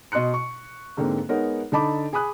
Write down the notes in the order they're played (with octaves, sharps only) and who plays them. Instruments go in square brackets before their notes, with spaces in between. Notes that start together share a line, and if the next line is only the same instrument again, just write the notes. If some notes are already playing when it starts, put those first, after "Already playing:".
[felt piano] B2 D#5 C6 F#6 C#7
C#6
G#2 D3 A#3 C4
G#3 B3 D#4 A#4 C#5 F#5
D3 D#4 D#5 A5 B5 D6
G#4 G#5 B5 D#6 F#6